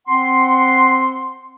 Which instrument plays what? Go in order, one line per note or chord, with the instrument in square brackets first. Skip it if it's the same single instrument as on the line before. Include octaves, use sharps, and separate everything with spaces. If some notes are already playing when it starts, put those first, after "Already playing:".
[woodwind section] C4 F#5 C6